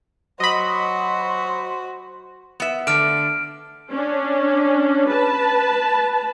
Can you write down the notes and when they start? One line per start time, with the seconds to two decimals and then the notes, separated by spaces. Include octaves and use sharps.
0.40 F#3 F#4 C5 D#5 B5
2.60 B3 E5
2.87 D3 A3 F6 D7
3.92 C#4 D4
5.08 B4 A5